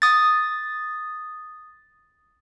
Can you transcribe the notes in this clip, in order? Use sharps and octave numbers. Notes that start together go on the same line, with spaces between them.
D#6 A6